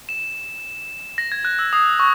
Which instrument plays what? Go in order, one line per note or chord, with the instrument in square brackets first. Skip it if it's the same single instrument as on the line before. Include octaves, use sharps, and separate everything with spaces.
[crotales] E7
A#6
G#6
F#6
E6
D#6
C#6